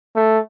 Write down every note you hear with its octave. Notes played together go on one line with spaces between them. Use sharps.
A3